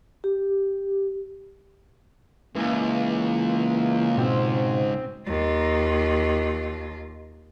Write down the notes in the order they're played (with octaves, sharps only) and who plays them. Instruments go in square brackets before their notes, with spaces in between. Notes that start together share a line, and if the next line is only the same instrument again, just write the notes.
[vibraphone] G4
[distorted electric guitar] C#2 [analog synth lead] E3 [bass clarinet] A#3
[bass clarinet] G#2 [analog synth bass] B2 [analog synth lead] C4
[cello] D#2 F4